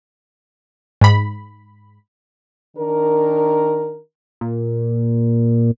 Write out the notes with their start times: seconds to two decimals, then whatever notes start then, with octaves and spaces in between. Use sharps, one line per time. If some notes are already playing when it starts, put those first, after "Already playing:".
1.01 G#2 B5
2.77 D#3 D4 A#4
4.41 A#2